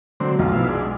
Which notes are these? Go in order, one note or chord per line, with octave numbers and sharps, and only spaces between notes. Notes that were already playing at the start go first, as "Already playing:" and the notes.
D3 F#3 C4
B1 F2 F3
B2 E4 F5
G#3 D4